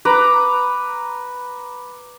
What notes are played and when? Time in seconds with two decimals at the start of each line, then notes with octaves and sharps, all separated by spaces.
0.05 B4 A#5 B5 D6